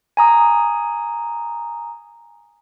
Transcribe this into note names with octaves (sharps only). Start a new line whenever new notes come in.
G#5 A#5 D#6